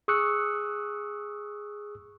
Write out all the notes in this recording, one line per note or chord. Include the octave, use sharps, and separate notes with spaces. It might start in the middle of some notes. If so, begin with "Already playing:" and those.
G#4 C#6 D#6 E6 F#6 C#7